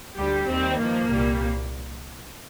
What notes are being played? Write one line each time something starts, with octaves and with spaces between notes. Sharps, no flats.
D2 D3 G3 G4
D#2 D#3 G3 C4
G2 F3 A#3
C2 A#2 G3